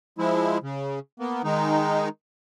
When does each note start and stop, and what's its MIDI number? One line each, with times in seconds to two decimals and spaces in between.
0.18 0.58 53
0.18 0.58 56
0.18 0.58 64
0.63 0.99 49
1.20 1.42 58
1.20 1.42 59
1.44 2.09 51
1.44 2.09 56
1.44 2.09 63